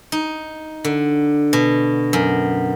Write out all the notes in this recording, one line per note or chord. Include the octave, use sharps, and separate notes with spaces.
D#4
D3
B2
F#2